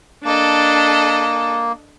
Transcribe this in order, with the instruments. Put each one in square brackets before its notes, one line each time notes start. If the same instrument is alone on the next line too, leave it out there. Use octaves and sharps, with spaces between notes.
[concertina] A#3 [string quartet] D4 A4 D#5